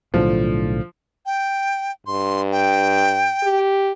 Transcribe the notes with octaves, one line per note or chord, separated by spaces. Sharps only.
B1 A2 D3 F3
G5
G2 C6
G5
G4